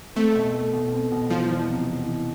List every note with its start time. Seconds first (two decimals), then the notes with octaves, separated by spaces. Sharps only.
0.16 A3 C4
0.35 B2
0.54 A3
0.73 B2
0.92 C4
1.12 B2
1.30 E3 F3
1.49 E2
1.69 C3
1.88 E2
2.06 E3